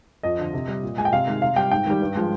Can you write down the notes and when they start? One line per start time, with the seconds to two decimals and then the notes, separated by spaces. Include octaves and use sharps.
0.23 F2 D#5
0.39 D3 F3
0.53 C3
0.68 G3
0.83 A#2
0.97 G#3 G#5
1.05 G5
1.13 C3 F5
1.27 D#3 G#3
1.42 C3 F5
1.56 G3 G5
1.71 G#2 G5
1.86 D#3 G3
2.01 G2
2.15 F3 G#3